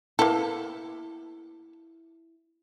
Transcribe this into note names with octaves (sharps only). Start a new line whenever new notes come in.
A#3 B3 E4 A4